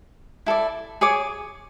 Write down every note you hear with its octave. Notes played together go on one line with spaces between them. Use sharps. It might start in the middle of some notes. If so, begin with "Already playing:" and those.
E4 A4 D5
G#4 C#5 D6